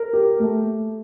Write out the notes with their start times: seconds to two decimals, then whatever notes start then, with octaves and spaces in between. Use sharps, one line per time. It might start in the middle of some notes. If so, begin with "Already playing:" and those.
Already playing: A#4
0.13 G4
0.40 A3